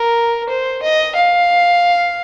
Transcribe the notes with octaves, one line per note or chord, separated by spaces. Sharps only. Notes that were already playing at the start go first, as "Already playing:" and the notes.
Already playing: A#4
C5
D#5
F5